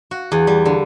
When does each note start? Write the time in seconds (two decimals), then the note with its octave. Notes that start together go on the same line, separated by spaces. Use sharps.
0.11 F#4
0.32 E2
0.47 G3
0.66 D3